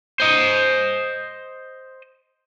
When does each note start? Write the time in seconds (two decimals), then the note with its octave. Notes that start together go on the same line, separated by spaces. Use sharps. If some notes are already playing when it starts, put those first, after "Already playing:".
0.20 C5 D#5